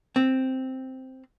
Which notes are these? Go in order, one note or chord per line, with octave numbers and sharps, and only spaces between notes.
C4